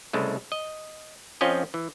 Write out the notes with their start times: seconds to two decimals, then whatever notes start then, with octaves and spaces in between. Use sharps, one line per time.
0.13 C2 C#3 G#3 A3
0.52 D#5
1.41 F2 F3 C4 C#4 D#5
1.74 E3